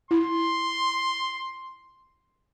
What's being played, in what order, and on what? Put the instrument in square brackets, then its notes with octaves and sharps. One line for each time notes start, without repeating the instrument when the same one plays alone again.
[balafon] E4 [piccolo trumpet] C6